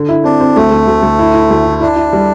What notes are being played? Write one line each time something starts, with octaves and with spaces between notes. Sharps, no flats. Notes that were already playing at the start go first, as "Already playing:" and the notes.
Already playing: D3
E4
C4 D4
C4
D2 A3
D2
D2
D2
E4
E4
D2
E4
D4 E4
E4
G3